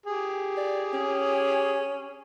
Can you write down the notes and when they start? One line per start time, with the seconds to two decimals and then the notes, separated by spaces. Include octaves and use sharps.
0.06 G4 G#4
0.57 D5
0.93 C#4